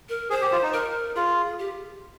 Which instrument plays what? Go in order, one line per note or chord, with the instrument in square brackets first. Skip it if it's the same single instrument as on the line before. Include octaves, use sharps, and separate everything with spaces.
[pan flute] A#4
[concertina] G#4 [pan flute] C5
[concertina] G4
F4
D#4
[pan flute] A#4
[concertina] F4 [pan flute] G#4
[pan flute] G4